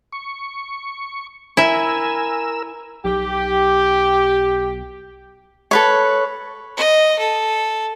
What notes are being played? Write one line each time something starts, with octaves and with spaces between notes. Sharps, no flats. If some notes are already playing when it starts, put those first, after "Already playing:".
C#6
E4 A#4 E5 G#5 E6
B1 G4
A4 B4 C#5
D#5
A4